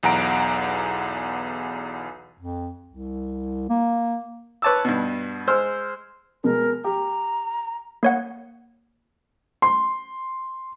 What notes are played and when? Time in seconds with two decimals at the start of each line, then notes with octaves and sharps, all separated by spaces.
0.03 B1 E2 F#5 A#5 D7
2.38 F2
2.87 C2
3.69 A#3
4.62 B4 C#5 A5 D6 E6
4.85 G2 B2
5.47 G#3 C5 E6 F6
6.44 B2 G#3 A#4
6.84 G4 A#5
8.03 A#3 C#5 F#5
9.62 C6